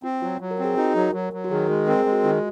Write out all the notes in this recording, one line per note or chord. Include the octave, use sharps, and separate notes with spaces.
C4 F4
F#3 F4
F#3
A#4
C4
G#4
D#4 F#4
F#3 A#4
F#3
F#3
F#4
D#3 G#4
G#3 G#4
C4 A#4
G#4
G#3
F#4
D#3 F4